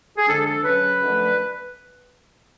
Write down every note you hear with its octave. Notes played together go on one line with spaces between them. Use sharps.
G#4
F2 D3 G#3 D4 A4
A4
C#3 F#3 C#4 B4
F#2 D3 F3 A3 D4